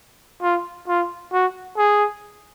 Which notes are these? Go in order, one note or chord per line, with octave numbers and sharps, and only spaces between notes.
F4
F4
F#4
G#4